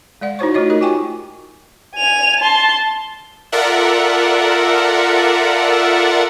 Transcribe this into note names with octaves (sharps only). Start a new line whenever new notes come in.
G#3 D5 F#5
D#4 E4 F#4 C5 C#5 C#6
A3 D#4 F4 F#4 C#5 D#5
D#4 G4 A#4 D#5
F4 F#4 G5 G#5 C#6 D6
G#5 F7
A5 C6
F4 A4 A#4 D5 E5 F#5